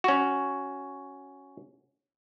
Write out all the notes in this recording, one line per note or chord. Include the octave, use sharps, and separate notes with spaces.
C#4 F#4